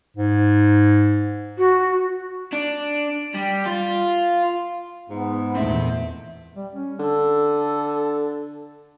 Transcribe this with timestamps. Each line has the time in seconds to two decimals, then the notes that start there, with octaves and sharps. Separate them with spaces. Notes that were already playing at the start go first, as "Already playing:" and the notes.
0.17 G#2
1.58 F#4
2.53 D4
3.35 G3
3.66 F4
5.10 G#2 B3
5.55 E2 A#2 A3 C4 E5
6.56 G3
6.74 C#4
6.99 D3 A4